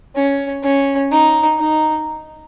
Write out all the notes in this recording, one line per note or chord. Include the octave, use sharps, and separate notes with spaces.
C#4
C#4
D#4
D#4